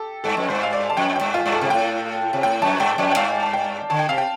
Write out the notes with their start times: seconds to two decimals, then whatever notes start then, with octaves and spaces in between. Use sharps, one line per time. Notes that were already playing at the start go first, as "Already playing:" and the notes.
Already playing: G4 A4
0.24 G2 A4
0.37 F2
0.49 G2 C5
0.63 F5
0.73 D5
0.90 A5
0.97 F2 G5
1.16 G5
1.21 G2
1.34 F4
1.46 G2
1.52 A4
1.61 C3
1.70 A2 G5
2.33 C3
2.43 A2 G5
2.62 F2 A5
2.80 G2 G5
2.98 F2 D5
3.11 G5
3.16 G2 F5
3.43 A5
3.53 G5
3.90 D3 A5
3.99 G5
4.09 C3 F5
4.18 G5